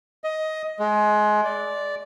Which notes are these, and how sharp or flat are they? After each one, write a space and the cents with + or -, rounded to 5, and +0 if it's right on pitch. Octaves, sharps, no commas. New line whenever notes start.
D#5 +15
G#3 +25
D5 -10